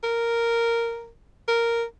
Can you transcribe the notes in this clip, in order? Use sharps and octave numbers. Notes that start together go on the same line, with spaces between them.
A#4
A#4